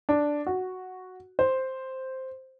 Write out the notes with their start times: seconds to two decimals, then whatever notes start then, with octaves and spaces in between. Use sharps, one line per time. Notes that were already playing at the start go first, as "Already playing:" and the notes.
0.09 D4
0.46 F#4
1.39 C5